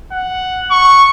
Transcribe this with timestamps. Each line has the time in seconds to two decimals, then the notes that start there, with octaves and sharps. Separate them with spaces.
0.12 F#5
0.71 C#6